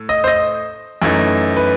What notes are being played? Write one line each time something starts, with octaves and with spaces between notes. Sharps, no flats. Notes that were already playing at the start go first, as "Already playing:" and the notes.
Already playing: A2
D#5
C5
D#5
F#2 E3 A3 D#4
B4